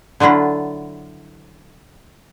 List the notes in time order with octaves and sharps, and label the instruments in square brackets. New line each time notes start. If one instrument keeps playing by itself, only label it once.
[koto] D3 F#3 D4 E4 F4